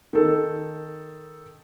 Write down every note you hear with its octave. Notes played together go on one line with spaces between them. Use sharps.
D#3 A4